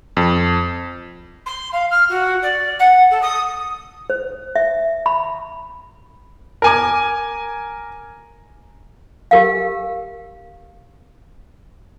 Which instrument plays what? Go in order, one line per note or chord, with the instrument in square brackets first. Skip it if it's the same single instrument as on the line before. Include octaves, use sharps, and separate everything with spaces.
[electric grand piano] F2
[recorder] C6
F5
F6
F#4
D5
F#5
A4
D#6
[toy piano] C5
E5
B5
[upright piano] A#4 G#5 D6
[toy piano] G4 A#4 F5